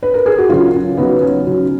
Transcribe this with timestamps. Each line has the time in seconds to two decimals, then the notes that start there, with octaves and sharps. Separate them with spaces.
0.03 B4
0.14 A#4
0.26 G#4
0.38 F#4
0.49 C#3 F#3 C#4 F4
0.74 C#4
0.97 C#3 F#3 B3 D#4
1.22 C#4
1.47 C#3 F#3